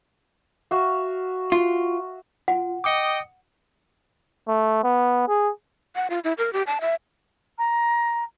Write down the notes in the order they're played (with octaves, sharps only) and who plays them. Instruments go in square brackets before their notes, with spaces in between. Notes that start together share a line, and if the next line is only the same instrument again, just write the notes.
[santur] F#4 E5 F5
[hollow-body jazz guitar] F4
[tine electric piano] F4 [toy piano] F#5
[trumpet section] D#5 G5 [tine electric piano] D6 D#6 C#7
[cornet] A3
B3
G#4
[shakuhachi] F#5
F4
E4
A#4
G4
A5
E5
[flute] A#5